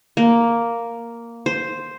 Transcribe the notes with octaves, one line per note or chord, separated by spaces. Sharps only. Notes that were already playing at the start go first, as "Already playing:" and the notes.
A#3
C5